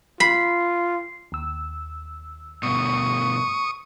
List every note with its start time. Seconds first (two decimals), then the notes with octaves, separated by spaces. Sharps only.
0.20 F4 B5 C7
1.32 D#2 E6
2.63 G2 B2 C#6 D#6